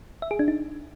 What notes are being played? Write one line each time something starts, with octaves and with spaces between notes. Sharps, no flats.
E5
G#4
D4
D#4